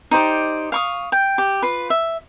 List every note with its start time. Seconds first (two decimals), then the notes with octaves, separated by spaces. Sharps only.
0.11 D#4 G4 C5 D5
0.72 F5 C#6 D#6
1.12 G5
1.38 G4
1.62 F4 B4
1.90 E5